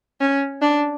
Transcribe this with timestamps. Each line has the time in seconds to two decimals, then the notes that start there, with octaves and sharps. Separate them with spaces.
0.21 C#4
0.62 D4